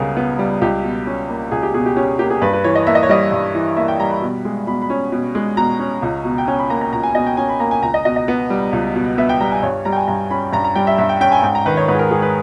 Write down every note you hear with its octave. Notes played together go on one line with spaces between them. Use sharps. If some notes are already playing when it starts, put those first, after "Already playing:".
Already playing: C#2 C#3 G3 B3 G#4 A#4
B3
G3
C#2 G4
B2
C#4
A#3
C#2 G#4
G4
B2 G#4
G4
C#4 G4
A#3 G4
G#4
G2 B4
B4
E3 C#5
D#5
A#3 E5
D#5
C#5
G3 D#5
G2
E3
A#3 E5
G5
G3 A#5
B5
B2
G#3
B2 B5
B5
C#4
B2
G#3
B2 A#5
C#4
C#2
B2
G5
C#4 G#5
B5
A#3 A#5
A#5
C#2 A#5
G#5
B2 D#5
G5
C#4 G#5
B5
A#3 A#5
G#5
C#2 A#5
D#5
B2 D#5
D#5
B3
G3
C#2
B2
B3 E5
G5
G3 A#5
G#5
G2 C#5
G3 A#5
G5
G#5
G2 A#5
C#4 B5
G2 A#5
A#5
G3 G5
E5
G2 E5
G5
C#4 G5
G#5
G#2 G5
A#5
D#3 B4
C#5
G#2 B4
G#4
A#4
G#3 G#4
B4